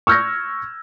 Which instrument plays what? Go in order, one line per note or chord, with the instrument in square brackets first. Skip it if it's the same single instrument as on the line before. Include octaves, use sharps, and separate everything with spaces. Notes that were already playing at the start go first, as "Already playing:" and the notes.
[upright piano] C#6 E6 F6 G6 G#6 A#6